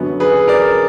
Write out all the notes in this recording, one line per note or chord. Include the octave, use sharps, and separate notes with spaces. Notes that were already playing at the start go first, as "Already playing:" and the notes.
Already playing: F#2 D3 F#3 B3
G#4 B4
A#4 D5